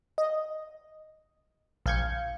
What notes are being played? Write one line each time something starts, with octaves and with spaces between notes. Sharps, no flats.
D#5
A#1 F5 G6 G#6 C#7